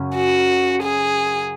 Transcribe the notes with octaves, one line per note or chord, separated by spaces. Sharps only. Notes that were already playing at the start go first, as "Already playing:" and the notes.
Already playing: F#2 C#3 C#4
F#4
G#4